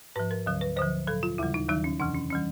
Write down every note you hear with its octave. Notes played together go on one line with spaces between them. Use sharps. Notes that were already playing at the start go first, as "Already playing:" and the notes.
G#2 F3 B4
A#4
D2 D3 F#3
B4
D2 D3 F3 C5
A#2 F#3 A4
F4
D#2 C#3 E3 G3 E4
D#4
D#2 D#3 F#3 D#4
C#4
F2 C3 E3 D4
C#4
E3 G3 C#4